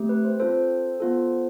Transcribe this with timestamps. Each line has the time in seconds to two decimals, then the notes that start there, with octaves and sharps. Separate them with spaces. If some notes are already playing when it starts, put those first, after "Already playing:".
Already playing: A3 C4 G4
0.09 B4
0.25 C5
0.40 C4 F4 A4 C5
1.00 B3 F4 A4